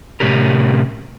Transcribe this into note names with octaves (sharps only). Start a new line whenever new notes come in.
A2 C3 C#4 G4 A#4